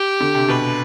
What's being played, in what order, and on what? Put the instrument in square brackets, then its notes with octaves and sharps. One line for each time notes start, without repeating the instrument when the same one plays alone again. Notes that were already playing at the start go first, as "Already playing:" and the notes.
Already playing: [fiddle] G4
[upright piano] D3
C3
[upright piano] B2 [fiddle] B4